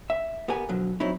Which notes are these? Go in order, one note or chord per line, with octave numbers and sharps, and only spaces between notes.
E5
B3 G4 A#4 G#5
B2 D3 F3 F#3
F#3 C4 D#4 E4